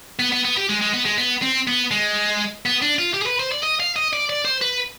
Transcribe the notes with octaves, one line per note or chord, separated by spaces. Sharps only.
B3
B3
B3
G4
G#3
G#3
B3
G#3
B3
C4
B3
G#3
B3
D4
F4
G4
G#4
B4
C5
D5
D#5
F5
D#5
D5
D5
C5
B4